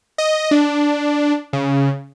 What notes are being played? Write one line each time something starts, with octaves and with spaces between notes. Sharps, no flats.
D#5
D4
C#3